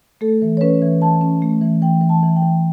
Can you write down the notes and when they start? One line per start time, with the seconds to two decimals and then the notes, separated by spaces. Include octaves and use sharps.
0.21 A3 A4
0.42 E3
0.57 C#5
0.61 C#4 B4
0.82 E3
1.02 E3 A5
1.21 C#4
1.42 A3
1.62 E3
1.82 E3 G5
2.02 E3
2.09 A5
2.23 E3
2.36 G5
2.43 E3